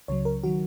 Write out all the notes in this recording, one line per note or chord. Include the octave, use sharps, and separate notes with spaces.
C#2 C#3 F#3 C#5
A#4
D#3 F#3 F#4